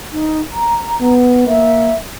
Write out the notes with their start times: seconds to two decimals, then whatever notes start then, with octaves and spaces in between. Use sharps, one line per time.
0.12 D#4
0.53 A#5
1.01 B3
1.47 A#3 E5